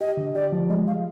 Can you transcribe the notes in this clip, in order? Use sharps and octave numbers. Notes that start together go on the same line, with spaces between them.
G4 D#5
D3
G4 D5
F3
G#3 D#5
F3 F5